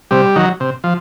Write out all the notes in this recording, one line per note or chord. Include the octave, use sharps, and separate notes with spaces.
C3 G3
D#3 F#3
C3
F3